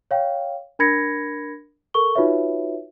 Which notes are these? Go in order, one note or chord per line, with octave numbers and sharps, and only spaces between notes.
C#5 F5 G5
D4 A#4 B5 G#6 A#6 C#7
A4 A#4 C#6 G7
D#4 F4 F#4 B4 C#5 E5